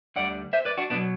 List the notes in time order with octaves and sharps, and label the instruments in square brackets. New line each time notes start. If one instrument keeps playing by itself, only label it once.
[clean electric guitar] D2 D3 G3 D5 F#5
C5 E5
B4 D5
D4 F#4
B2 F#3 B3 D4